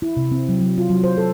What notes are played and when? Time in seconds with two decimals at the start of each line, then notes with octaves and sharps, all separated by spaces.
0.02 E4
0.17 C3
0.32 C4
0.49 F#3
0.60 F#3
0.78 F4
0.90 F#3
1.04 C5
1.17 A4